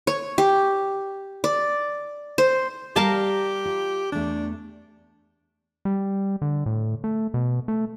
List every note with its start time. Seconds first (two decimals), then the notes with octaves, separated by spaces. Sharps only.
0.07 C#5
0.38 G4
1.44 D5
2.38 C5
2.96 G3 G4 A#4 F5 A5
3.65 F4
4.12 E2 A3 D4
5.85 G3
6.42 D3
6.66 A2
7.04 A3
7.34 B2
7.68 A3